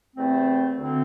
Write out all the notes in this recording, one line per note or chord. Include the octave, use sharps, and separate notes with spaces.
E2 C3 A3 C4
D2 D3 C4